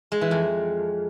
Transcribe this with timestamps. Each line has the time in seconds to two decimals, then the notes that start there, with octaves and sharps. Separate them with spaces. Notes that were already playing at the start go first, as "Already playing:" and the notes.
0.12 G#3
0.21 E3
0.31 F2